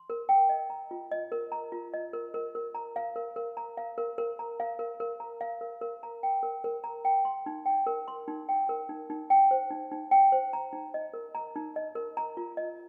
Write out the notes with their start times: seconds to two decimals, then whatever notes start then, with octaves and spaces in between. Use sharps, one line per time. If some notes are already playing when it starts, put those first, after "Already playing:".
Already playing: C6
0.10 A#4
0.29 G5
0.49 D#5
0.70 A#5
0.91 F4
1.11 D#5
1.32 A#4
1.52 A#5
1.72 F4
1.94 D#5
2.13 A#4
2.34 A#4
2.55 A#4
2.75 A#5
2.96 F5
3.16 A#4
3.36 A#4
3.57 A#5
3.77 F5
3.98 A#4
4.18 A#4
4.39 A#5
4.60 F5
4.79 A#4
5.00 A#4
5.20 A#5
5.41 F5
5.61 A#4
5.81 A#4
6.03 A#5
6.23 G5
6.43 A#4
6.64 A#4
6.84 A#5
7.05 G5
7.25 C6
7.46 D#4
7.66 G5
7.87 A#4
8.08 C6
8.28 D#4
8.49 G5
8.69 A#4
8.89 D#4
9.10 D#4
9.30 G5
9.51 C5
9.70 D#4
9.92 D#4
10.11 G5
10.32 C5
10.53 A#5
10.73 D#4
10.94 D#5
11.14 A#4
11.35 A#5
11.56 D#4
11.76 D#5
11.95 A#4
12.17 A#5
12.37 F4
12.57 D#5